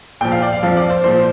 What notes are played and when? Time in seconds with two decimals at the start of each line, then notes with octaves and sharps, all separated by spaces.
0.21 A#2 F3 G5
0.32 F5
0.42 D5
0.53 F5
0.63 F2 F3 F5
0.77 D5
0.90 C5
1.04 A#2 F3 C5